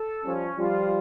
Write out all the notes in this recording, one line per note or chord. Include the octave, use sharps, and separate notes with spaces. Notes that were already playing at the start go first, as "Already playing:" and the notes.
Already playing: A4
F3 G3 C#4
F3 G3 F4